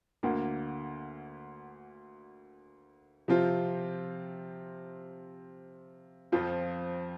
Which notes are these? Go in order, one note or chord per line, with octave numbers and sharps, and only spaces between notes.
D2 D3 A#3
C3 F3 C4 F4
F2 F3 C4 F4